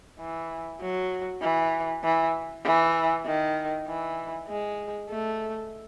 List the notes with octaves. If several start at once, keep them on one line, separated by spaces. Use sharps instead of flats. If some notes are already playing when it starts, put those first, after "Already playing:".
E3
F#3
E3
E3
E3
D#3
E3
G#3
A3